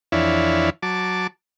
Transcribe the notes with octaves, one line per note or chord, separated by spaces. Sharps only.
F2 E3 D4 E4 C#5 F5
F#3 A5 D6